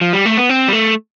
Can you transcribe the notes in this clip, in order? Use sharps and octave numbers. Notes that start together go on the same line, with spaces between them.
F3
G3
A3
B3
C4
G3
A3